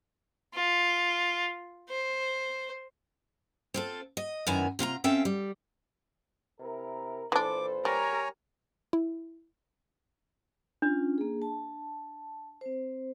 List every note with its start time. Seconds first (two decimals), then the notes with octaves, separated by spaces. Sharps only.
0.54 F4
1.89 C5
3.74 C4 F4 A4
4.17 D#5
4.47 F#2 D#3 B3 E4 G#5 A#5
4.79 C3 F4 F5 A#5
5.04 C4 C#4 A4 E5 F5 G5
5.25 G3
6.60 C3 E4 A#4
7.32 A#2 E3 D4 A4 B4 C5 D6
7.85 G3 G4 A#4 C#5 G#5 A#5
8.93 E4
10.82 C#4 D4 F4
11.18 A#3 G#4
11.42 A5
12.61 C4 C5